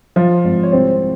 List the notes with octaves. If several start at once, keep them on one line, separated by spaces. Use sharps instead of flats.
F3 F4
G#1
C#5
C2 C4 C5